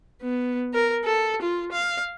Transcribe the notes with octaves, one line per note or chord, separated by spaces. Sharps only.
B3
A#4
A4
F4
F5